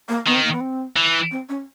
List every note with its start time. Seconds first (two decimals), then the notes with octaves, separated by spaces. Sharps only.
0.09 A#3
0.26 D#3 B3
0.35 C4
0.44 A#3
0.52 B3
0.61 C4
0.97 E3
1.31 C4
1.49 C#4